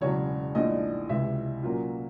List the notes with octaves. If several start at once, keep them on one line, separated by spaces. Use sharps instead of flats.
E1 E2 C#3 F#3 C#5
A#1 G#2 E3 A3 D4 D#5
C#2 C3 E3 E5
A#2 F#3 A#3 C#4 F4